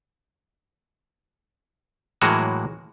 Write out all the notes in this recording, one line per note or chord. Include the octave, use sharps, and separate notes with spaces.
A2 E3 F#3 G#3 A#3 F#4